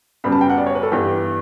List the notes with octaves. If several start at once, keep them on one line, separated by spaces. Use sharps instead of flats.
F#2 C#3 G3 B3 B5
A5
G5
F#5
D5
C#5
B4
A4
G2 E3 B3 G4